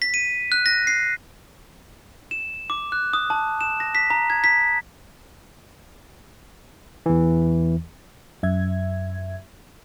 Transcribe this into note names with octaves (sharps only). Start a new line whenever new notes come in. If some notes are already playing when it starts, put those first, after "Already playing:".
B6
D#7
F#6
A#6
C7
E7
D6
F#6
D#6
A5
E7
A#6
B6
A#5
G#6
B6
E2 E3
F#2 E5 G#6